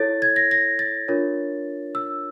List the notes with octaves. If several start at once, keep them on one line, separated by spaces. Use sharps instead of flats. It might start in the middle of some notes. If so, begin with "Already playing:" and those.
Already playing: E4 A4 C#5 A6
G#6
A#6
A#6
A6
D4 F4 A#4 C#5
E6